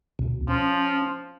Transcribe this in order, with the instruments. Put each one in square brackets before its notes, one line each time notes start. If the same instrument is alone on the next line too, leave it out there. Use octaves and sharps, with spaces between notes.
[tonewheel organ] D2 B2
[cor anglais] F3 [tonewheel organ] C#4